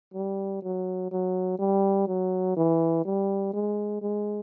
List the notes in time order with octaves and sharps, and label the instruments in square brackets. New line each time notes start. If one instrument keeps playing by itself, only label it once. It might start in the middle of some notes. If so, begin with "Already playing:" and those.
[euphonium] G3
F#3
F#3
G3
F#3
E3
G3
G#3
G#3